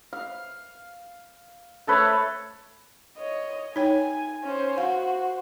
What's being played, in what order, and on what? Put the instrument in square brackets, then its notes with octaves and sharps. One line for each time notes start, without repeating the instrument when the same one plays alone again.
[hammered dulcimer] F5
A3 A4 B4 C#5
[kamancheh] C#5 D#5
[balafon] D#4 C#5 G5 [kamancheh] G#5
[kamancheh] C#4 C5
[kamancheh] F#4 C5 [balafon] F5